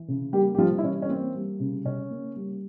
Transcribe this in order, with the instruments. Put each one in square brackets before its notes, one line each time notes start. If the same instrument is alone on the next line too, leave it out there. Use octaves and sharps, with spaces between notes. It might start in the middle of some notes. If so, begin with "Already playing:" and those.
Already playing: [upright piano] E3
C#3
G3 A#3 G4
G4
F3 G3 F4
E4
E3 C#4
C#4
A#3 C4
G3
C#3
C#3 C#4
A#3
G3